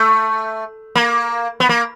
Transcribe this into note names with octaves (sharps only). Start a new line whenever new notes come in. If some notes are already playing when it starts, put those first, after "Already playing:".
Already playing: A3
A#3
B3
A#3